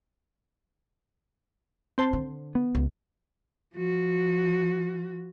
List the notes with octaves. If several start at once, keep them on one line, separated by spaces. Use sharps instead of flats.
C4 C5 A5
D3
B3
C#2
F3 F#4